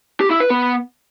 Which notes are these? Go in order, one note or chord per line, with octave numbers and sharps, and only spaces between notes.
G4
E4
B4
B3